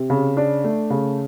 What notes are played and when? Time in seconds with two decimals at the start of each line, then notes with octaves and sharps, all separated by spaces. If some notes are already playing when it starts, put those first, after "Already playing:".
Already playing: C3
0.10 C#3
0.37 D4
0.64 A3
0.90 C#3